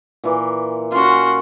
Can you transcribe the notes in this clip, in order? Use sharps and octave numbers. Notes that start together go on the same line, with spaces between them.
A#2 E3 D6
C#4 F4 F#4 C6